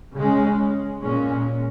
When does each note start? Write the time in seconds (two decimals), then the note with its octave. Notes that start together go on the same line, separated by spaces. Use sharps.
0.16 C#3 G#3 C#4
1.02 A#2 G#3 C#4